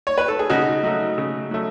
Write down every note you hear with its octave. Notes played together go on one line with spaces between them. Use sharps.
C#5
B4
A4
G#4
C#3 D#4 F#4
F#3 A3 D#4
C#3
F#3 A3